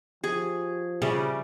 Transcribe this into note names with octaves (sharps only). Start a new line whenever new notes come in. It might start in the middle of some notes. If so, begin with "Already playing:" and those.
F3 G4 G#4
C#3 G3 G#4 E5 G#5